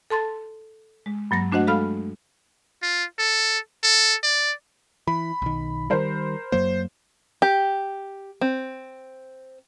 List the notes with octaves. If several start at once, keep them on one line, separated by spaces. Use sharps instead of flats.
A4 A5 C6 A6
G#3
G2 F#3 A#3 A#6
A3 D4 F#4 C5 D#5 F#5
G#3 A4 F5 B5 F6
F4
A4
A4
D5
E3 B5
B1 D#3
D#3 G3 A#4 C5
F#2 F#3 A#3 C5
G4
C4